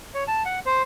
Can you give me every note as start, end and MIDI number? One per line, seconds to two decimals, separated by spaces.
0.14 0.24 73
0.28 0.43 81
0.45 0.59 78
0.66 0.82 72